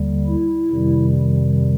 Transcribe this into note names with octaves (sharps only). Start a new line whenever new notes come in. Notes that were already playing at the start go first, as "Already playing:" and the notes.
Already playing: D#2 D3 G3
E4
F2 C3 D#3 G3